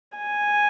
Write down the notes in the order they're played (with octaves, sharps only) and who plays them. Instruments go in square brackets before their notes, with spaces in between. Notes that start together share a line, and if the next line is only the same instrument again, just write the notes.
[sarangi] G#5